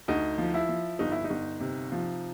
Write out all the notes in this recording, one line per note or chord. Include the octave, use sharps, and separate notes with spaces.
D2 D#4
F3
E4
F3
G1 D#4
E4
D#4
G1
C3
F3